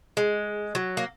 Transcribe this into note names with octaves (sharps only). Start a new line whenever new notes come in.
G#3
F#3
A#3